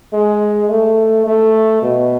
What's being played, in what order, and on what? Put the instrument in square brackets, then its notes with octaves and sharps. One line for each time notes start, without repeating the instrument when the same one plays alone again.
[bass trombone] G#3
A3
A3
B2